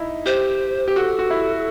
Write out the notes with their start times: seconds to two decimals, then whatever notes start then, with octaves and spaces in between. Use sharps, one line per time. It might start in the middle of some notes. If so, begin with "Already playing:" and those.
Already playing: D#4 E4
0.26 G4 C5
0.88 G4
0.96 F#4 A4
1.19 F#4
1.30 E4